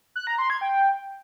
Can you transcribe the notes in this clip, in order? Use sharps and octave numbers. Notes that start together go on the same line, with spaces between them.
F#6
A#5
C6
G#6
G5